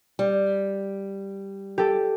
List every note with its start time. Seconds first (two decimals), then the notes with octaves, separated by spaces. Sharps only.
0.19 G3
1.78 G4 A4